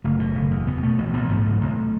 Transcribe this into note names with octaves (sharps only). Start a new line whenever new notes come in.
F#1 A3
B2
F#1
E2
B2 B3
B2 A3
A1
A1 B3
G#2 A3
B1
B1